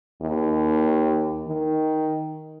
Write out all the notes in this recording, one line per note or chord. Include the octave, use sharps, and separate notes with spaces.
D#2
D#3